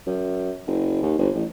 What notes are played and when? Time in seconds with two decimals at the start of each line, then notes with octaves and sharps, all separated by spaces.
0.07 F#2
0.67 F#1
1.02 D#2
1.19 G1
1.35 A1